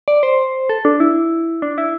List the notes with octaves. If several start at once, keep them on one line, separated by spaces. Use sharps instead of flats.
D5
C5
A4
D4
E4
D4
E4